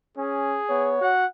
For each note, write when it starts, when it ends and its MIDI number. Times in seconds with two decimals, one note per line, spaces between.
0.17 0.60 61
0.17 0.94 68
0.69 0.99 59
0.69 1.09 73
1.01 1.25 66
1.01 1.27 78